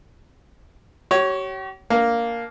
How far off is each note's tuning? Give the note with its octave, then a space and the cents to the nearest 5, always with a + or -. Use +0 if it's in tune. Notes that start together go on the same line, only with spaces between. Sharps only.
G4 -45 C#5 +0
A#3 +0 D4 -20